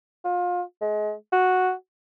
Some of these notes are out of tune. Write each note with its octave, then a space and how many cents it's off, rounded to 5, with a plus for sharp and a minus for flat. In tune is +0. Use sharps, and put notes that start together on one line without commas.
F4 +30
G#3 +30
F#4 -5